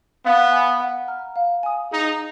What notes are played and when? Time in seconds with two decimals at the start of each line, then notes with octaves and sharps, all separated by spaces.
0.25 B3 F5
0.52 G#5 B5
0.80 F#5
1.08 A#5 F6
1.36 F5
1.63 G#5 D#6
1.91 D#4 G#4